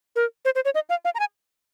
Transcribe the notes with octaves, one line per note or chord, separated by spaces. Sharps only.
A#4
C5
C5
C#5
D#5
F5
F5
A#5
G#5